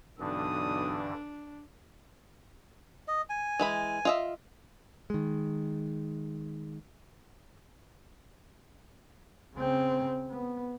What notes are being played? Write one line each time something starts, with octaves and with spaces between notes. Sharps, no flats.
B1 G2 D3 E3 D4 D#6
D#5
G#5
E3 G#3 B5
F4 D#5 E5
D#3 G#3
C#3 C4
B3